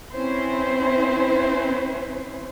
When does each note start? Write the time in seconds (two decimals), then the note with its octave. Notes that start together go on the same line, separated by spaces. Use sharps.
0.11 C4 C#4 E4 B4 C5